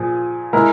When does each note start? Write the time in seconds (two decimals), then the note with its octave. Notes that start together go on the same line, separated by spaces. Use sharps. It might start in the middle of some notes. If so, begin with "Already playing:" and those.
Already playing: A#2 F3 G#4
0.53 G#3 E4 A#4